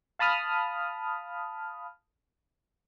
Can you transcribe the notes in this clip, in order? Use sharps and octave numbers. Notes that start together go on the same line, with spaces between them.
F5 A5 B5 D#6 F6